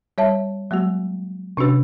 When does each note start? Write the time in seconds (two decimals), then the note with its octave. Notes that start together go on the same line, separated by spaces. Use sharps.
0.18 G3 C#5 E5 A5
0.71 F#3 G#3 A#3 F#4
1.57 C3 C#4 D4 F#4 B4